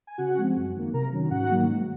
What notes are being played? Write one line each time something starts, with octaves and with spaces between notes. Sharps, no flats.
G#5
C#3 F#4 F#5
F3 G#3 C4
F#2
D#3 A#3
C3 A#4 A#5
D#3 F#3 C#4
G#2 F#4 F#5
D#3 F#3 A#3
G#2